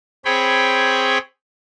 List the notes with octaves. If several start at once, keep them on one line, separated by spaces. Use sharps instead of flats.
C4 G#4 C#5 G5 B5